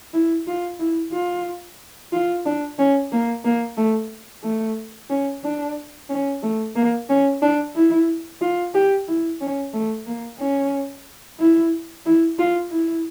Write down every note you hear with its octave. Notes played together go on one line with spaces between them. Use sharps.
E4
F4
E4
F4
F4
D4
C#4
A#3
A#3
A3
A3
C#4
D4
C#4
A3
A#3
C#4
D4
E4
F4
G4
E4
C#4
A3
A#3
C#4
E4
E4
F4
E4